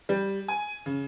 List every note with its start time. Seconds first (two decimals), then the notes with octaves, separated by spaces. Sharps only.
0.09 G3
0.48 G#5
0.86 C#3